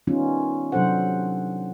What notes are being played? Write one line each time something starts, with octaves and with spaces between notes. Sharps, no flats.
D#3 G3 B3 C#4 D#4 F4
C3 F#3 D4 A4 C5 F#5